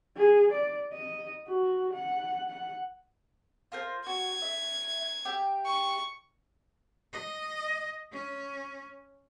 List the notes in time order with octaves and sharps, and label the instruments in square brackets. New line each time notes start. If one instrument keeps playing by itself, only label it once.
[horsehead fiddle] G#4
D5
D#5
F#4
F#5
F#5
[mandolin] F4 A#4 C5
[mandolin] F#4 [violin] G#6
[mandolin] E5
G4 E5 G5
[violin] C#6
[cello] D#5
C#4